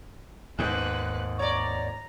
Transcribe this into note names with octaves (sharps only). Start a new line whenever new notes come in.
D#2 G#2 B3 B4 F#6
C#5 D5 A#5